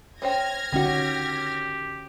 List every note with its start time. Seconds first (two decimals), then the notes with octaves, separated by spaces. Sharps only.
0.22 C#4 C5 G5 F6 G#6 A#6
0.73 D3 D#3 C#4 F#4 G4 F#5